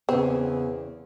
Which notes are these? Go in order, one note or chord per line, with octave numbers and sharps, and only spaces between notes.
E2 C#3 B3 C4